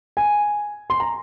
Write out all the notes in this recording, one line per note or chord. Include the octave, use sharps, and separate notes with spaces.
G#5
C6
A#5